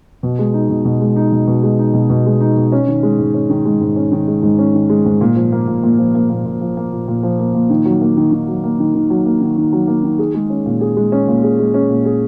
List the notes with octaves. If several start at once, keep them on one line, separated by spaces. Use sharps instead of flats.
B2
G#3
D#4
B2
B2
G#3
D#4
B2
B2
G#3
D#4
B2
B2
G#3
D#4
B2
C#4
D#3
G#3
G#2
C#4
D#3
G#3
G#2
C#4
D#3
G#3
G#2
C#4
D#3
G#3
G#2
A#2
F3
A#3
A#2
A#2
F3
A#3
A#2
A#2
F3
A#3
A#2
A#2
F3
A#3
A#2
D#3
F#3
A#3
D#3
D#3
F#3
A#3
D#3
D#3
F#3
A#3
D#3
D#3
F#3
A#3
D#3
G#4
G#3
C#4
A#2
G#4
G#3
C#4
A#2
G#4
G#3
C#4
A#2
G#4